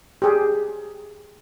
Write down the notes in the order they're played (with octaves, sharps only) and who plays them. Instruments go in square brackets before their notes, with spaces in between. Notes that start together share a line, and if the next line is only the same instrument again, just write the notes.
[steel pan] G4 G#4